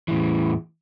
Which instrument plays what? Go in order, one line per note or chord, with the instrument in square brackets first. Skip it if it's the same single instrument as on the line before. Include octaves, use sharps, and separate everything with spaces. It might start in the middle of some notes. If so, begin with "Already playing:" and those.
[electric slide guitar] E3
A2
E2